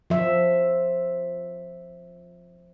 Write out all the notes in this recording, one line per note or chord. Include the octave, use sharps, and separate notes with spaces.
F3 E5